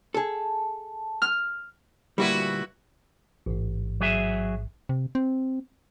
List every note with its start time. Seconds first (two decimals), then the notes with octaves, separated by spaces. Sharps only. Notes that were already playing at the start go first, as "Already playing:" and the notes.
0.14 G#4 A4 A5
1.22 F6
2.18 D2 A#2 G3 E4 F#4 B4
3.46 A1 G#2
4.01 F#3 G#4 E5
4.89 C3
5.15 C4